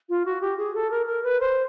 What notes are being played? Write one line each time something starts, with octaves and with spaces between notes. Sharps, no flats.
F4
F#4
G4
G#4
A4
A#4
A#4
B4
C5